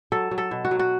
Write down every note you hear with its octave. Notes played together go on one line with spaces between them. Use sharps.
F#3 A4
F#3
A4
B2
F#4
F#3
F#4